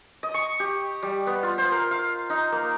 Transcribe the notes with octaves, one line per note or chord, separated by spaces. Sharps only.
D#5
C#6
G4
G3
B3
F4
C5
A#4
F5
D#4
A#3